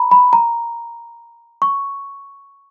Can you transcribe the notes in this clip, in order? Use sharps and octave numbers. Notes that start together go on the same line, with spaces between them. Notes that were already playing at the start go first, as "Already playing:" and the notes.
Already playing: A#5 B5
B5
A#5
C#6